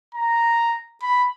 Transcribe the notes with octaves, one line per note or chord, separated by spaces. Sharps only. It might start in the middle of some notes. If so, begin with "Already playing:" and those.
A#5
B5